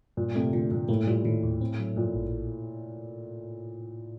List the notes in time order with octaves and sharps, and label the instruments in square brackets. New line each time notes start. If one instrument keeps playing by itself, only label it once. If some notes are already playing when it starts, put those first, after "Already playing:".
[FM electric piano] G2 [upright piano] A#2
[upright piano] C3 [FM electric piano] A3
[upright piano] A#2 [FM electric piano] D3
[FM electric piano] G2 [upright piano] A#2
[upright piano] A2 [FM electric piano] A#3
[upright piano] A#2 [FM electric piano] G3
[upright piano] A2 [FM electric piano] D#3
[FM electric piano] D#2
C4
F#3
[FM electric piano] G2 [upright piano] A#2
[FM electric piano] A1